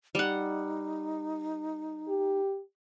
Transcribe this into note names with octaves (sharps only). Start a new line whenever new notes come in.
G3 D#4 F#5
G4